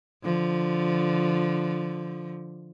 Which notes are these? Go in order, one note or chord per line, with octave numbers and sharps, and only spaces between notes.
D3 F3